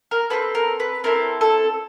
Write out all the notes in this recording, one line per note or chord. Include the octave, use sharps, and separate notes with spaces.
A#4
C4 E4 A4 B4
A#4
B4
C4 E4 A4 A#4
A4